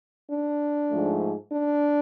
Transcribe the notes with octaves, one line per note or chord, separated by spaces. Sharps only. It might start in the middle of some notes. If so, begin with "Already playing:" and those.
D4
G#2 F3 A3
D4